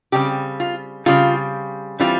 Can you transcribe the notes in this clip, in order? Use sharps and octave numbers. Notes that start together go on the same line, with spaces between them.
C#3 G3 C4 G4
F4
C#3 G3 C4 F4
E3 G3 C4 F4